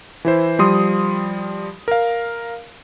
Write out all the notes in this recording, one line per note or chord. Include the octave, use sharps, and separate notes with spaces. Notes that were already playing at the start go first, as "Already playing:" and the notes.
E3 E4 C5
F3 G3 C6 D#6
A#4 F5